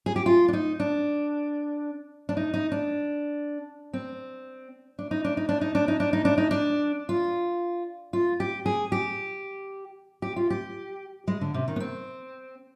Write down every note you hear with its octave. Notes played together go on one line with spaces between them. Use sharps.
G#4
G4
F4
D4
D#4
D4
D4
D#4
D#4
D4
C4
D4
D#4
D4
D#4
D4
D#4
D4
D#4
D4
D#4
D4
D#4
D4
F4
F4
G4
G#4
G4
G4
F4
G4
G#3
D3
C3
D#3
B3
C4